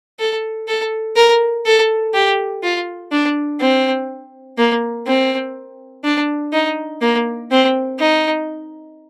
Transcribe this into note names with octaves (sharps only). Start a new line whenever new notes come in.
A4
A4
A#4
A4
G4
F4
D4
C4
A#3
C4
D4
D#4
A#3
C4
D#4